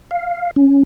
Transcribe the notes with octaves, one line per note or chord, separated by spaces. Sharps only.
F5
C#4